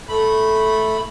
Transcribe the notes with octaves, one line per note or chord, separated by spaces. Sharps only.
A3 B5